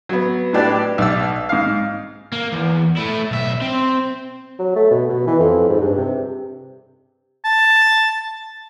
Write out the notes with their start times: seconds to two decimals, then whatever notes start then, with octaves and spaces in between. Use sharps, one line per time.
0.09 F#3 B3
0.53 A2 D4 G4 B4 D5
0.98 B1 D5 E6
1.49 G#2 F5
2.32 A#3
2.53 E2
2.97 A3 E4
3.31 B1 E5
3.61 C4
4.59 F#3
4.76 A3
4.91 B2
5.09 B2
5.27 E3
5.40 F2
5.69 G#2
5.82 G2
5.97 C3
7.45 A5